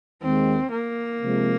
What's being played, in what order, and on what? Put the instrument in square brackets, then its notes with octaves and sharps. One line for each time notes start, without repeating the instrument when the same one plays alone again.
[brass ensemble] D#2 D#3 G#3 [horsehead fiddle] C4
[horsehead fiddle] A#3
[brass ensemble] C3 F3 G#3